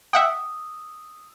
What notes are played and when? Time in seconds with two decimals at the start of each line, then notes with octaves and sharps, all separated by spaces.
0.13 E5 F#5 G5 D#6 E6